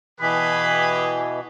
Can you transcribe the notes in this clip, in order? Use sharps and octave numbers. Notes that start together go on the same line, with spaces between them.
B2 E3 G4 G#4 B4 B5